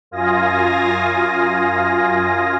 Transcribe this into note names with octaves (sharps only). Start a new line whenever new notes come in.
F#2 F4 F5 G#5 D#6 A#6